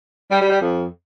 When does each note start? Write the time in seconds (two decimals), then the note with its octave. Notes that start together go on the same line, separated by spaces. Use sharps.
0.30 G3
0.40 G3
0.50 G3
0.60 F2